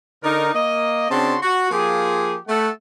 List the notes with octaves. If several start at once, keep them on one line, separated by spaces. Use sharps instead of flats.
D3 D#4 A#4
A#3 D#5
C#3 C4 D4 F#4 A5 C6
F#4
F3 A#3 F4 G4 G#4
A3 A4 F#5